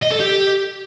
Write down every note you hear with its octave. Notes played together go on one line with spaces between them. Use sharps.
D#5
A4
G4